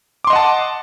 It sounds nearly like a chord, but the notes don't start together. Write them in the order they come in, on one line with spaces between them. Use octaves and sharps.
D6 C6 D#5 F#5 A5